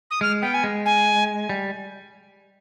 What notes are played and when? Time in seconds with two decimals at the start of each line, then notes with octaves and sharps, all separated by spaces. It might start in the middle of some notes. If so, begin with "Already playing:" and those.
0.10 D#6
0.21 G#3 F6
0.42 B3 G5
0.54 G#5
0.64 G#3
0.85 G#5
1.49 G3